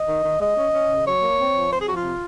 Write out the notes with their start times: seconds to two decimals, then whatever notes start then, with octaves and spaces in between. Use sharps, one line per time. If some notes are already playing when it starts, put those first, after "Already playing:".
Already playing: D#5
0.08 D#3
0.24 D#3
0.40 G#3 D#5
0.57 C#4
0.73 C#4
0.90 C#3
1.06 F#3 C#5
1.22 A#3
1.38 C4
1.54 F3
1.70 C4 C5
1.79 G#4
1.87 F3 F#4
1.95 F4
2.03 C3